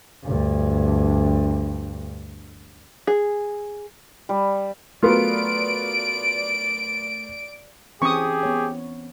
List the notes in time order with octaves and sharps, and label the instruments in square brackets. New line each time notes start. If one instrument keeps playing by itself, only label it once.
[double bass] D2 G2
[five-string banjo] G#4
[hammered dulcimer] G3
[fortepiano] F#3 B3 F4 [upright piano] A3 A#4 [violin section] D5 D7
[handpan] E3 C4 C#4 [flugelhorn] G4 [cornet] G#4 [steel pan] C#6 D#6
[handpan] B3 C#5